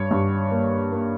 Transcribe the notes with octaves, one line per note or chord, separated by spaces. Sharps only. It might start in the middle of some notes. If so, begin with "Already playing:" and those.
Already playing: G2 C#5
G2
A#3
A#3